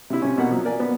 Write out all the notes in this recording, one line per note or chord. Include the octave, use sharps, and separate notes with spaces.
C3 E4
C3 C#4
B2 A#3 F#5
F3 F#3
A#4 D5 G#5
B3